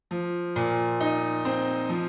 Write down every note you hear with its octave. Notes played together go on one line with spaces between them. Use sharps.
F3
A#2
D#4
C4
F3